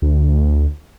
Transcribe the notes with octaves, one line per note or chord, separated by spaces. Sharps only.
D2